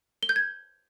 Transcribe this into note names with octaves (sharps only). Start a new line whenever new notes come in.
G7
G6
G#6